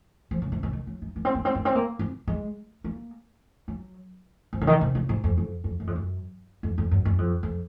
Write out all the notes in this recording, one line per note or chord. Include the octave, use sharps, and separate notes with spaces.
F3
C#3
C3
C#3
D#3
F#3
D#4
A#3
C4
A#3
C4
A#3
C4
A#3
C4
G#3
A#3
F#3
F3
C#3
D#3
C3
C#3
G#2
F2
F2
F2
F#2
F2
F#2
F2
F2
F#2
F#2
F2
F2